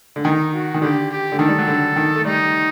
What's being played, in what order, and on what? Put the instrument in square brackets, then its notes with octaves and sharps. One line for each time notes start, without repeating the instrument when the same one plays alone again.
[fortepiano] D3
[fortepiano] D#3 [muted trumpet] D#4
[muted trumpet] F#4
[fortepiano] D#3
[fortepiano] D3 [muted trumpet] G4
[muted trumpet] G4
[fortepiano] D3
[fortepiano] D#3 [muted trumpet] A4
[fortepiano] G3
F#3
D3
D#3
A3
[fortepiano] G3 [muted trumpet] D#4